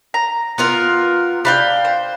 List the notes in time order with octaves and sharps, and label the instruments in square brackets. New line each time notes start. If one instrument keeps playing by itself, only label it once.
[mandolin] A#5
[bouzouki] B3 F4 A#4
[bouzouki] D4 F5 G5 [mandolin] B5
[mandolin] C5